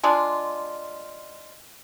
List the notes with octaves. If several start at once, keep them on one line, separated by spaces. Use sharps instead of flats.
G#3 D4 F4